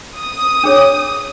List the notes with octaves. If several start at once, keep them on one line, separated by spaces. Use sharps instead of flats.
D#6
D4 G#4 C#5